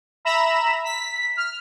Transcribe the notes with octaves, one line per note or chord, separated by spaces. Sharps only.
E5 A#5 B5 E7
B6
F6